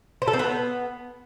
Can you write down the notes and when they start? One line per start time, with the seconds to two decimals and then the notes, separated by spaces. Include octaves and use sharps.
0.22 C5
0.28 A4
0.33 C4
0.39 B3